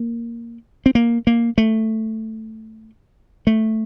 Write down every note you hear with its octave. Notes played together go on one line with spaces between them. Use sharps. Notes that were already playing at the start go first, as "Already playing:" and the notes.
Already playing: A#3
C4
A#3
A#3
A3
A3